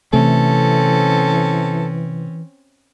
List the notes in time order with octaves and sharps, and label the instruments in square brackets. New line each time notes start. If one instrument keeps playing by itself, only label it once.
[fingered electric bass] C3 A3 [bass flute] E3 [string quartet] C4 C#4 [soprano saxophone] A4